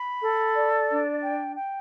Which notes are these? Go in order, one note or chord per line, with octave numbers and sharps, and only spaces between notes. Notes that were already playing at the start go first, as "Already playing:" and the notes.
Already playing: B5
A4
D5
D4
G5
G5